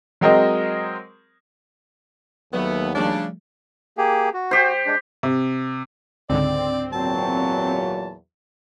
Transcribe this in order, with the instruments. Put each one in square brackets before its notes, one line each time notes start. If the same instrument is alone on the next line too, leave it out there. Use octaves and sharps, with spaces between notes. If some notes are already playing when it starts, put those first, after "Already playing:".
[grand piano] F#3 G#3 C4 A#4 C5 D#5
[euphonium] D#2 [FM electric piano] F#3 D5 [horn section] A3 B3
[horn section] C#3 D4 [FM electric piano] F3 G3 A3
[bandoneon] A#3 G4 G#4
F#4
[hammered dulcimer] G4 C5
[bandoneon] G#3 D4
[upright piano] C3
[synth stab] C#2 G#2 D3 [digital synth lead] C4 [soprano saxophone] D5
[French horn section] E2 A#2 F#3 [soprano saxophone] A5